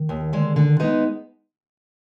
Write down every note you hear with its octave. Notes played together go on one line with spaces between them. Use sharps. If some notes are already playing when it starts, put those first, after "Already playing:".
Already playing: D#3
D#2
D3 G#3
D3
G#3 B3 D#4